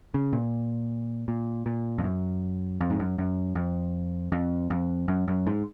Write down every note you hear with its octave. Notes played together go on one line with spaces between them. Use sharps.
C#3
A#2
A#2
A#2
F2
F#2
F2
G#2
F#2
F#2
F2
F2
F2
F#2
F#2
G#2